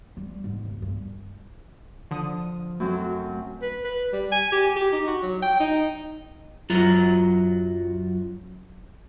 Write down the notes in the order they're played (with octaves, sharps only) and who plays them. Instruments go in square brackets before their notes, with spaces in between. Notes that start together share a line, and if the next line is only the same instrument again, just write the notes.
[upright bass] G3
G#2
D#1
G2
[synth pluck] D3 D#6 D#7 [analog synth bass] F3
[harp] F#2 F#3 C4 [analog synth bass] A3
[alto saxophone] B4
B4
G3
G#5
G4
G4
D#4
F#4
F#3
G5
D#4
[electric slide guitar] F#2 F#3 F4 F#4 A#5